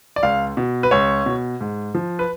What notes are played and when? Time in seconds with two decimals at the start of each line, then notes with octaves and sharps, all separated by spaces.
0.16 D5
0.23 C#2 F5
0.57 B2
0.83 B4
0.91 C#2 C#5
1.26 B2
1.61 G#2
1.95 F3
2.19 B4